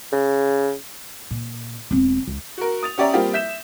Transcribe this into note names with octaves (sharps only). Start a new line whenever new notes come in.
C#3
A#2
E1 C4
C#2
F#4 A#4
D#6 A6 F7
C#4 G4 D5 E5 A#5
G3 A#3 C4 F4 G4
E5 G6 B6 E7